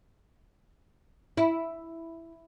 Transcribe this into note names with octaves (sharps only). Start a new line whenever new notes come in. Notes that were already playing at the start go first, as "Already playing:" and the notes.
E4